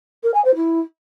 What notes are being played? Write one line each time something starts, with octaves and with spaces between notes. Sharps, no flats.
A#4
G#5
C5
E4